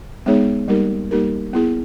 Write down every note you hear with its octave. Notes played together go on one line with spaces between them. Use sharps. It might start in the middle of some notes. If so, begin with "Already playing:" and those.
G#3 B3 D#4 G#4 C#5
G3 A#3 D#4 G4 A#4
G3 A#3 D#4 G4 A#4
B3 E4 G#4